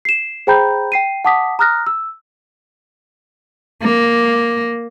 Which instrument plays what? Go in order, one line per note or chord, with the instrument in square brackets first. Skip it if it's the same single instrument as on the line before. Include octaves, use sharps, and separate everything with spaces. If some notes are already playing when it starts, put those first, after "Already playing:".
[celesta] C7 E7
G#4 C5 G5 A#5 B5 G6
G5 C7 D#7
F#5 A5 D6 D#6 B6
A#5 D#6 F6 F#6 A#6
E6
[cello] A#3